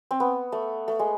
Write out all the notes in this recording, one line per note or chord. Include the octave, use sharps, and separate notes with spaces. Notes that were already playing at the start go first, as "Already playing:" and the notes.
C4
B3
A3
A3
G#3